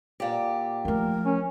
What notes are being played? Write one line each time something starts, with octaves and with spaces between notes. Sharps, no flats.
A#2 G4
F3 A3 A#4
C#4